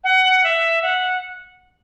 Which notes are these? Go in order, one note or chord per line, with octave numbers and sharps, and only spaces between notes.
F#5
E5
F#5